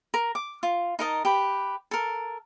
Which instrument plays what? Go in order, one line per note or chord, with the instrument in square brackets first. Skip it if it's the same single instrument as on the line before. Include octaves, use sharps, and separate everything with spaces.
[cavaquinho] A#4
D6
F4
D#4 A#4 D#5 A5
G4 B4
A4 A#4